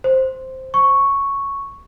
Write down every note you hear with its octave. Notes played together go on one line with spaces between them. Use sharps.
C5
C#6